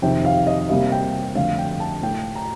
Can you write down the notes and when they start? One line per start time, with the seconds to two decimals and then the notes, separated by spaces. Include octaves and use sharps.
0.02 F2 C3 D#3 G5
0.25 F5
0.47 D#5
0.69 C3 G3 A#3 F5
0.92 G5
1.35 F2 D3 A3 F5
1.58 G5
1.80 A5
2.03 A2 A3 G5
2.35 A#5